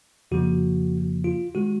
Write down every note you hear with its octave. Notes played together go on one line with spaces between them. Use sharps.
F2 C#3 F3 A#3 F#4
F4
D#3 G#3 F#4